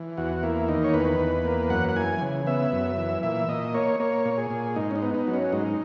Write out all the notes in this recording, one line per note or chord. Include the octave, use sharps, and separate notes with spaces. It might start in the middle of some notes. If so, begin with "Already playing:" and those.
Already playing: E3
E2 F#4
A#3 E4
D#3 D#4
C#5
E2 B4
E2
A#3
F#2 F#5
F#5
E3 G#5
C#3
B3 E5
F#2
E3
A#2 E5
A#2 D#5
A#3 C#5
A#3 C#5
A#2
G#4
A#2
G#2 D#4
C#4
D#4
B3
D#4
F#3
C#4
G#2 D#4